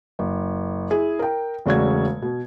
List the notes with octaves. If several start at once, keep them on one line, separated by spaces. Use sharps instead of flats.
F#1
E4 G#4
A#4 G5
E1 C#3 A3 F#4 D5 G#6
B2